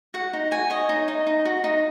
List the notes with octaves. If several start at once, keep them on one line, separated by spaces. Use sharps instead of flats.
F#4 F#5
D#4
F#4 G#5
C#5 D#5
D#4
D#4
D#4
F#4
D#4